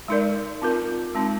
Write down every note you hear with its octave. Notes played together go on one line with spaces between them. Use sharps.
G#3 D#4 A#4 D5
C4 F4 A#4
G#3 C4 D#4